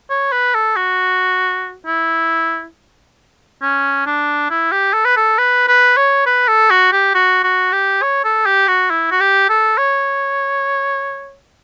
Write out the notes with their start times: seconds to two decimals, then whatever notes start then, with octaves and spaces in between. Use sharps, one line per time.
0.10 C#5
0.32 B4
0.55 A4
0.76 F#4
1.86 E4
3.62 C#4
4.06 D4
4.50 E4
4.72 G4
4.94 A4
5.05 B4
5.17 A4
5.38 B4
5.68 B4
5.97 C#5
6.26 B4
6.48 A4
6.71 F#4
6.93 G4
7.15 F#4
7.44 F#4
7.73 G4
8.02 C#5
8.24 A4
8.46 G4
8.68 F#4
8.90 E4
9.11 F#4
9.20 G4
9.49 A4
9.78 C#5